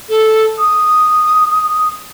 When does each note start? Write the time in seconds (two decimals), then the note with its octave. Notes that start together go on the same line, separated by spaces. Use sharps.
0.09 A4
0.58 D#6